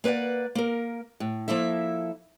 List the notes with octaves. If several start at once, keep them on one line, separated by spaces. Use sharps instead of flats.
A#3 B4 C5 D5 F#5
A#3 A#4
A2
F3 A#3 E4 A4 E5